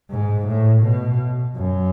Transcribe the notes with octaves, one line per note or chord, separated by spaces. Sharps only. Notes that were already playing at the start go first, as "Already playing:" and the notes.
G#2
A2
B2
F#2